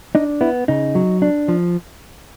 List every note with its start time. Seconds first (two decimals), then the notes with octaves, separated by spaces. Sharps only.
0.15 D4 D#4
0.41 B3 E4
0.68 C#3 D#4
0.95 F#3
1.22 D4
1.48 F3